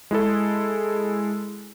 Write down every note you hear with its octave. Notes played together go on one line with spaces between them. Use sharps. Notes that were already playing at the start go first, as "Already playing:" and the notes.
G#3 E4 G#4 A4